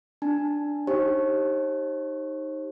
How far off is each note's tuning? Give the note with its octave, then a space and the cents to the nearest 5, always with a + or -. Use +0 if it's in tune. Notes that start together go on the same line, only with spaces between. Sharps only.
D4 +0 A5 +0
D#4 +0 G4 +0 C5 +45